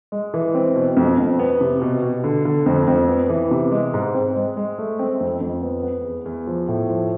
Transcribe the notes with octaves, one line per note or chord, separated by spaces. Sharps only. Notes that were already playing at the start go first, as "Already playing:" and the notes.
G#3
E3
C4
B2
F2
F2
B3
C3
B2
B2
D3
D3
F2
F2
B3
E3
C3
G#3
G#2
C4
G#3
G#3
A3
C4
F2
F2
B3
B3
E2
E2
F3
A2
F3